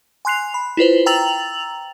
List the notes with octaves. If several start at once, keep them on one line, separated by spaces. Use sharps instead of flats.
G#5 C6 F#6 C7 F7
B5
E4 F4 B4 C5
G5 A#5 E6 A6 F7 F#7